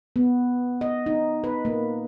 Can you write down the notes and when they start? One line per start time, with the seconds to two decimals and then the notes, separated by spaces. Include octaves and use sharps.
0.16 B3
0.81 D#5
1.06 D#4
1.44 B4
1.65 A#3